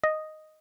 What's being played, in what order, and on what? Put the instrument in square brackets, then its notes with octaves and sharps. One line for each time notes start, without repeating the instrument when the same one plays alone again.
[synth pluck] D#5